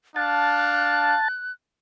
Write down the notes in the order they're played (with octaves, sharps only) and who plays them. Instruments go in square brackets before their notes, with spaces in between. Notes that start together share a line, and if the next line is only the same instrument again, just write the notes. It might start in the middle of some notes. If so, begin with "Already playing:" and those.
[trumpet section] D4 F5 [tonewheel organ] A5 [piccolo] F#6